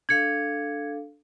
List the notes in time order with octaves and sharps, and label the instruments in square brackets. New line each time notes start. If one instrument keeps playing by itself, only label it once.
[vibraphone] D4 A4 F5 [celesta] G#6 C#7